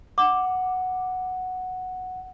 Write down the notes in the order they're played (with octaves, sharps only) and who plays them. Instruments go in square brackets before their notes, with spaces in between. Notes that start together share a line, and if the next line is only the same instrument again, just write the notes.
[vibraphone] F#5 [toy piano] D6